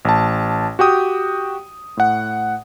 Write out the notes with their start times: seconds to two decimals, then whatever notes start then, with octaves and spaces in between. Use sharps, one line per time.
0.05 A1 A5
0.79 F#4 G4 G5 D#6
1.97 A2 F#5